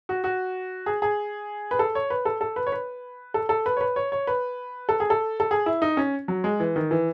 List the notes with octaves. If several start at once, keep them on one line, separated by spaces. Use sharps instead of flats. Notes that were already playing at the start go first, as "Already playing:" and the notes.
F#4
F#4
G#4
G#4
B4
A4
C#5
B4
A4
A4
B4
C#5
B4
A4
A4
B4
C#5
B4
C#5
C#5
B4
A4
G#4
A4
A4
G#4
E4
D#4
C#4
F#3
G#3
E3
D#3
E3